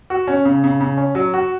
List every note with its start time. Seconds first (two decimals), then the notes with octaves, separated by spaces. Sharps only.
0.10 F#4
0.27 C#4
0.45 C#3
0.64 C#3
0.80 C#3
0.97 C#4
1.15 F#3
1.34 F#4